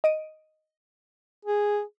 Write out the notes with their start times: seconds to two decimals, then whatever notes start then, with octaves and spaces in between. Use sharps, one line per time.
0.04 D#5 D7 D#7
1.45 G#4